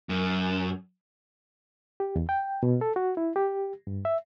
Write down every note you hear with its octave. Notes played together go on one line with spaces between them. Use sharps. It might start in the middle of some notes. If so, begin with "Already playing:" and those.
F#2
G4
E2
G5
B2
A4
F#4
E4
G4
G2
E5